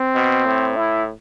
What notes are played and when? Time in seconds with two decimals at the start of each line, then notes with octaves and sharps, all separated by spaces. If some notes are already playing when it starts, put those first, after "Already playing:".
Already playing: C4
0.14 B2
0.46 A2
0.76 E4